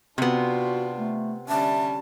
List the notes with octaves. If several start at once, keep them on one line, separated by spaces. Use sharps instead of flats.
C3 B3 D4 F4 F#4
A3
D3 G3 C#4 E5 A5